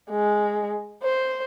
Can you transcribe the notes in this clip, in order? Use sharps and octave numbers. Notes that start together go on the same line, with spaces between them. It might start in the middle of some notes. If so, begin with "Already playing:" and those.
G#3
C5